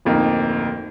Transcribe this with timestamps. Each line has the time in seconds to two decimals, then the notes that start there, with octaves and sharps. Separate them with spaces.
0.05 D1 F2 A#3 D#4